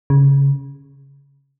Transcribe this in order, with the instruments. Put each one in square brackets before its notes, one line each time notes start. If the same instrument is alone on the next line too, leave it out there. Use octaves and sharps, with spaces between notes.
[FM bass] C#3